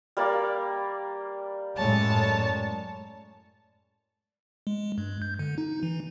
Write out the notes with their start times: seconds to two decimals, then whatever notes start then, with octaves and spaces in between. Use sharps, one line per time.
0.17 G3 A#3 D5
1.77 F#2 A2 G#3 C#5 A5
4.67 G#3
4.98 G2
5.22 G6
5.39 D3
5.58 D#4
5.83 E3